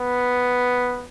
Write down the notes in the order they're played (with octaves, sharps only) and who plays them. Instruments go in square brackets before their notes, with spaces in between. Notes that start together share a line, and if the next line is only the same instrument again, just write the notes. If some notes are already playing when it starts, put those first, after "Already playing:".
Already playing: [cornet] B3